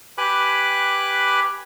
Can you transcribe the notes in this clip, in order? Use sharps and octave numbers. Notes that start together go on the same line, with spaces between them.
G4 B4 G#5 B5 D6 F#6